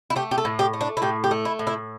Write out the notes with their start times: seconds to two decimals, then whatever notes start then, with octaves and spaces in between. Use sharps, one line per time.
0.10 E4
0.16 A3 G4
0.31 G4
0.38 A4
0.45 A2
0.59 G4
0.73 A3
0.81 D4
0.97 E4
1.02 A2 G4
1.24 G4
1.31 A3
1.45 E4
1.59 A2
1.67 E4